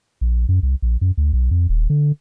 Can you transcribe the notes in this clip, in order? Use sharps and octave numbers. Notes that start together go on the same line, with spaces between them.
A#1
F#2
C2
A#1
F#2
D2
B1
F2
D#1
D3